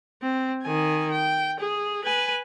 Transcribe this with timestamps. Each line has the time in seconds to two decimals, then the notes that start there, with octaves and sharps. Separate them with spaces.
0.22 C4
0.63 D#3 G#5
1.11 G5
1.60 G#4
2.04 B4 G#5